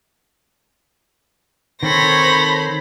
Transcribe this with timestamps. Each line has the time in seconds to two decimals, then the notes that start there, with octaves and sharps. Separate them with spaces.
1.83 D#3 C4 A4 C5 C#5 B5 A#6